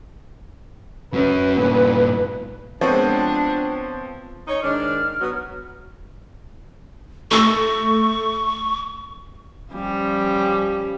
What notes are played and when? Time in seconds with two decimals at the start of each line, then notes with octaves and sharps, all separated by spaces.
1.14 F#3 C#4 B4
1.57 G2 A#2
2.81 F3 G#3 B3 C4 D4 C#5
4.47 D#4 C#5
4.62 G#2 D#3 D4 F6
5.20 F#3 B3
7.31 A3 C#6 E6 A#6
9.72 F3 G3 C#4